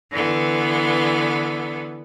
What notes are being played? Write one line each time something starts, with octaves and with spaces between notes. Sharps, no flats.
D3 E3 B3